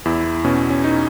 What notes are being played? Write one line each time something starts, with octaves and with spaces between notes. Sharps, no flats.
E2 E4
B2 C#4
C#4
D#4